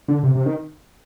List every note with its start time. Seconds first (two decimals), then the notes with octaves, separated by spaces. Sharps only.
0.08 D3
0.23 C3
0.35 C3
0.46 D#3